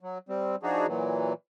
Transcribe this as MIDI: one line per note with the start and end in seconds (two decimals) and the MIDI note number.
0.01 0.18 54
0.29 0.56 55
0.29 0.56 60
0.63 0.86 53
0.63 0.86 62
0.63 0.86 63
0.63 0.86 66
0.63 0.86 68
0.87 1.33 46
0.87 1.33 52
0.87 1.33 54